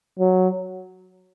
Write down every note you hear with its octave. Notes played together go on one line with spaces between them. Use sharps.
F#3